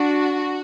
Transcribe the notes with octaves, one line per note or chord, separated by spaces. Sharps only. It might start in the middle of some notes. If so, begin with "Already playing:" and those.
Already playing: D4 F#4